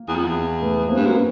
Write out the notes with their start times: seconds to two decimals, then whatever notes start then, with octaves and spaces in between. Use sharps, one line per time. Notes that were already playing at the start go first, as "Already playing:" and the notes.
Already playing: A#3
0.08 E2
0.16 F2
0.25 E2
0.62 A3 B3
0.89 A#3 C4
0.96 G2
1.06 F#2
1.15 B3 C#4